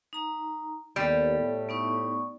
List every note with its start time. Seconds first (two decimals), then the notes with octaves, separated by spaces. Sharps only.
0.13 D#4 A#5
0.96 D#2 G3 B3 A4
1.38 A2 A3
1.69 B3 D#4 C#6